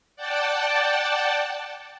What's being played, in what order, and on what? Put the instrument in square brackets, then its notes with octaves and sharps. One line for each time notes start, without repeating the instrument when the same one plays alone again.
[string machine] D5 F#5 G5 A5